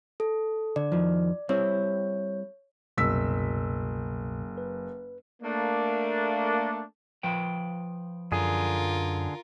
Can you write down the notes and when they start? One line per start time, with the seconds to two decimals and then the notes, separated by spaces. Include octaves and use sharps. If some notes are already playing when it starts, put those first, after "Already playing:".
0.20 A4
0.76 D3 D5
0.92 F2 D#3 F3
1.49 G3 C4 E4 C#5
2.97 F#1 C2 F#2 B2 E6 B6
4.57 B4
5.43 A3 A#3 D4
7.23 F3 B4 G5
8.32 F#2 D3 F4 G#4 A#4